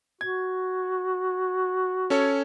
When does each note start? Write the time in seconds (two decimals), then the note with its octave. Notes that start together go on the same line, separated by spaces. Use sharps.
0.21 F#4 G#6
2.10 C#4 A4 C#5